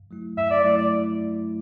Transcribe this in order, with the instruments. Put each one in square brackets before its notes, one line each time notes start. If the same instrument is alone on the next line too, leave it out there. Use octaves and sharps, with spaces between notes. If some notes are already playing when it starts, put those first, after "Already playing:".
Already playing: [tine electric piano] G2
F#3 A3 E4
[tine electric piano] G2 [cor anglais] E5
[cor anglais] D5
[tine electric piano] F#3 A3 E4 [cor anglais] D5
[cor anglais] D5